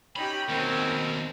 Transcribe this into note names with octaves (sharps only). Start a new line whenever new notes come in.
C#4 D#4 G4 G5 B5
D#2 B2 C4 D#4 A#4